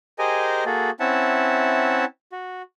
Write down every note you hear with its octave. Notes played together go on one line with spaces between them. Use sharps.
G4 G#4 A#4 C5 D#5 G#5
A#3 F#4 G#4 A4
C4 C#4 E4 E5 F#5 A5
F#4